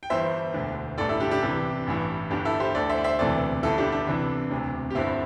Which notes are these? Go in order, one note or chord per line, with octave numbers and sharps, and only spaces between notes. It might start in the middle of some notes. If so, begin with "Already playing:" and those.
G5
G1 G2 E3 C5 E5
E1 D2 D3
A1 G2 D3 A4 D5
E4 A4
D4 G4
D4 G4
C2 C3 E3
A1 G2 E3
G1 G2 D3 D4 G4
E4 A4
G4 C5
D2 D3 A4 D5
C5 E5
D5
C5 E5
E1 D2 C3 E3 A4 D5
G1 G2 D3 E4 A4
D4 G4
D4
C2 C3 E3 D4
E1 D2 C3
G4
G1 G2 D3 C4 E4